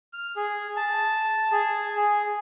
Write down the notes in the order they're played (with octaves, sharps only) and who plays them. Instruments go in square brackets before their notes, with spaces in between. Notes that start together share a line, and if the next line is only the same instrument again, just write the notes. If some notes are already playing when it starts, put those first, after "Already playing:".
[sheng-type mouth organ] F6
G#4
A5
G#4
G#4